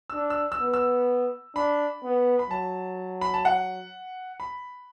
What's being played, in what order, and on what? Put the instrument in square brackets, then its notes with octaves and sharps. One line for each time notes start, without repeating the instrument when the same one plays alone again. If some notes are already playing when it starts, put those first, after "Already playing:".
[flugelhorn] D4 [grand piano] E6
[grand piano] E6
E6
[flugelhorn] B3
[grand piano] E6
[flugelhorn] D4 [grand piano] B5
[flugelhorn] B3
[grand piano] B5
[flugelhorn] F#3 [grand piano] A5
[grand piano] B5
A5
F#5
B5